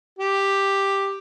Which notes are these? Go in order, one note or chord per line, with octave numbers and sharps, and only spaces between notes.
G4